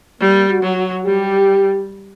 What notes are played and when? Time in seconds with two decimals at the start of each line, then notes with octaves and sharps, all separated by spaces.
0.20 G3 A#3
0.49 F#4
0.62 F#3
0.77 F#4
1.05 G3 G4